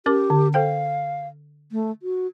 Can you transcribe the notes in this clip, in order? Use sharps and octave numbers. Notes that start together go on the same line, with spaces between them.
C#4 G4 A#4 D6
D3
A4 C5 F5 G5
A3
F#4